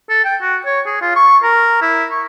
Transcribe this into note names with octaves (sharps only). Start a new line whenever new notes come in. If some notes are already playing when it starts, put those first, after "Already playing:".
A4
G5
F#4
C#5
G#4
F4
C#6
A#4
E4
C#6